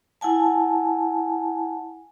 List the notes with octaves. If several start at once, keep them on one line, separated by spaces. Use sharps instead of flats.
E4 F#5 G#5 A5